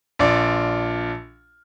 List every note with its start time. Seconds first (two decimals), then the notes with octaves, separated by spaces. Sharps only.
0.19 A#1 F4 D5